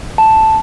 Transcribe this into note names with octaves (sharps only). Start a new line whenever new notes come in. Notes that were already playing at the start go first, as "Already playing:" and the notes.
A5